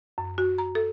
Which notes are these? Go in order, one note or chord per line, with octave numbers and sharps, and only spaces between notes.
F#2
F#4
A#5
A4